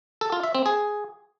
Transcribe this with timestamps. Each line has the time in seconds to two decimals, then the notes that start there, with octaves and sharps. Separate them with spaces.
0.21 A4
0.32 F4
0.43 E5
0.55 C4
0.66 G#4